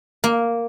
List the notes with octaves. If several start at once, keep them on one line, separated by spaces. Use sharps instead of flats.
A#3